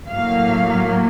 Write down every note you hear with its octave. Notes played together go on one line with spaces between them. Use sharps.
A2 F#3 A#3 F5